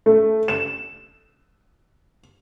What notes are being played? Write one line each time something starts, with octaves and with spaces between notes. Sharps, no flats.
A3
E7